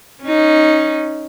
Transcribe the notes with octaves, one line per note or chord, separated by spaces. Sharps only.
C#4 D#4